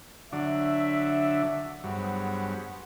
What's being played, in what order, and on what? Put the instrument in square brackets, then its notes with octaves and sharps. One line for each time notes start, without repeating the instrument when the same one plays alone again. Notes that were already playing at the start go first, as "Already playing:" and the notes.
[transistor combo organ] D3 F#3 D4 [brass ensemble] E5
[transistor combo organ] G2 F#3 [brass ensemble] B3 G#4 C5